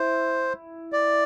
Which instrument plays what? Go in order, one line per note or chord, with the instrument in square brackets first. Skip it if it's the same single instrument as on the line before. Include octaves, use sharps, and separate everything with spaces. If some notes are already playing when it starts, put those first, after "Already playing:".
Already playing: [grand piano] E4 [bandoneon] C5
[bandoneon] D5